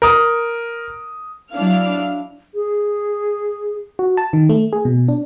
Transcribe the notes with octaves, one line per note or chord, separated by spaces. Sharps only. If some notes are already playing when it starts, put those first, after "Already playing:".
A#4 D#6
F#3 D4 E4 F5 F6
G#4
F#4
A5
D#3
A3
G#4
B2
D4